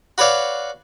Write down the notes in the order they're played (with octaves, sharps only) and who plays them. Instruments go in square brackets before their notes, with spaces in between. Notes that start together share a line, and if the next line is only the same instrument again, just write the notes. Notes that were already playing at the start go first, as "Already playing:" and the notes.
[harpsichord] F#4 B4 C#5 D5 F5